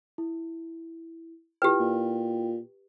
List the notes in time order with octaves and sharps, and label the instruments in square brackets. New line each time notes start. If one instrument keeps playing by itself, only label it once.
[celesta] E4
[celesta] E4 F4 G5 [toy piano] G4 B4
[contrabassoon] A#2